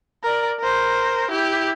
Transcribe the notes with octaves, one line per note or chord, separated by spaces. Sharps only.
A#4 D5
A#4 C5
E4 G4